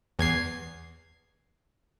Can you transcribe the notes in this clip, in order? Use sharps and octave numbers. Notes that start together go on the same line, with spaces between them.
E2 G#6 C7